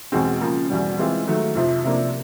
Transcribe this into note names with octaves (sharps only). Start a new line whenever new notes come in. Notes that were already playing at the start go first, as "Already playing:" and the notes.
E2 B2 G#3 C4
C#3 F3 A#3
E2 B2 G3
E3 G#3 C4 F4
D#3 F#3 A3
F2 C3 F3
C3 F3 A#3 D4